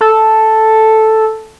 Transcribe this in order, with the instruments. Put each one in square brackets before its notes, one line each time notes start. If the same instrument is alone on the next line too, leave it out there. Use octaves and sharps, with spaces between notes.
[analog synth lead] A4